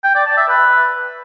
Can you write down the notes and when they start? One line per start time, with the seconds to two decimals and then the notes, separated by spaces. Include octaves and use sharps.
0.04 G5
0.15 D5
0.26 A5
0.37 E5
0.48 B4